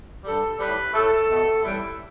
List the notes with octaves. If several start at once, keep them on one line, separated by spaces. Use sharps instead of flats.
G2 G3 A4
A2 G3 B4
A2 A3 A4
B2 A3
A2 E3 G3 E4